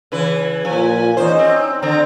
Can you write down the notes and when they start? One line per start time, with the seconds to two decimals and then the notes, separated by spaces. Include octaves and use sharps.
0.12 C#3 E3 B4
0.65 A#2 F3 G#5
1.17 E2 C#4 D#4 C5
1.39 C4
1.82 D3 C4 A#5